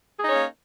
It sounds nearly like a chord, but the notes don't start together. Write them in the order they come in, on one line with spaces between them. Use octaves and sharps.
G#4 D#4 C#5 C#4 A#3